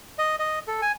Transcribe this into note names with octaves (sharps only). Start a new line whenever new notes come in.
D#5
D#5
A4
G#5